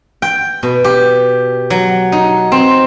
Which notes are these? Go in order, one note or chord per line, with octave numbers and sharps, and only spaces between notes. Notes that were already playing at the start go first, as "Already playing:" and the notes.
G5
B2
G4
F#3
D#4
C4